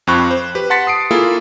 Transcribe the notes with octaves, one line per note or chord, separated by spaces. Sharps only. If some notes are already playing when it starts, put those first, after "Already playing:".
F2 C4 F4 B5 C#6 F#6
C5
G4 B4
F#5 A5 C6 A6 B6 C#7
D#6 C7 D7
A#3 E4 F4 G#4 A4